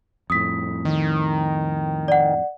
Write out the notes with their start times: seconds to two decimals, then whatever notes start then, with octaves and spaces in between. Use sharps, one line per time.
0.30 F2 A2 D#6 B6
0.85 D#3
2.08 D5 F#5